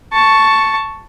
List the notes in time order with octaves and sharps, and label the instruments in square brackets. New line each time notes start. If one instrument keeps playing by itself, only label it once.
[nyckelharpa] A5 C#6